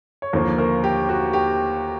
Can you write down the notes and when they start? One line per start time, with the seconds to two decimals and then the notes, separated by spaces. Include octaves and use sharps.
0.22 C#5
0.33 D#2 D3 F3 A#3 A#4 C5
0.58 A#4 C5
0.84 G4
1.09 F#4
1.33 G4